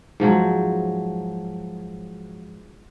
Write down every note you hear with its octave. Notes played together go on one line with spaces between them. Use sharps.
G#2 F3 F#3